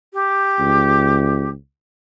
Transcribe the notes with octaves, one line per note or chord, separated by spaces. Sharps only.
G4
C#2